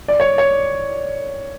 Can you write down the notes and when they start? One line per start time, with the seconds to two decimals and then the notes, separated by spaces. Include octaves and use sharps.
0.08 D5
0.20 C#5
0.38 C#5